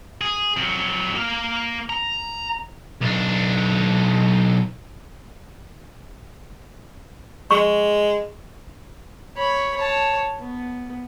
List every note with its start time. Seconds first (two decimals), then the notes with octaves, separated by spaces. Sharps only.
0.21 G#4
0.57 F2 F#3
1.15 A#3 F5
1.90 A#5
3.01 B1 D4
7.51 G#3 C#6
9.37 C#5 B5
9.77 C#5 A5
10.40 B3